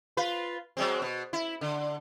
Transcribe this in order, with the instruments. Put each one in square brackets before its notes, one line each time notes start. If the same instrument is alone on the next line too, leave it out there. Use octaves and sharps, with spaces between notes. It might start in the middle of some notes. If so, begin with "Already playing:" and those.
[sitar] F4 B4
F#3 G#3 C4
B2
E4
D3